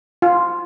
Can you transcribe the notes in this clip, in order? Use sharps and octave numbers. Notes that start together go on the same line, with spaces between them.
F4